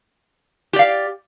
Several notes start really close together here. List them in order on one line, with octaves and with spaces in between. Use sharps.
G4 D5 F5